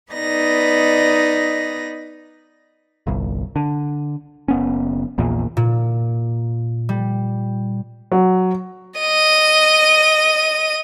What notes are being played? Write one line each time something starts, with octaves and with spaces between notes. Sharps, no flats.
B3 D#4 B4 D5 D#5 A#6
G1 C2
D3
F#1 B3 C#4
A#1 E2 A#2
A#2
G3
F#3
D#5 D#7